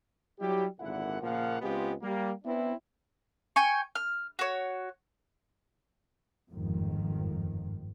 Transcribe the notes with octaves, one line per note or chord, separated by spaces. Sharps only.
F#3 G3 E4 G4
G#1 A#2 D3 E4 F#5
A#2 C#3 F3 A#3 F5 F#5
C#2 G#3 B3 C4 F4 G4
G3 A#3 G4
B3 C4 D4 E4
G5 G#5 C#6
F6
F#4 C#5
G1 F2 G#2 D#3 F3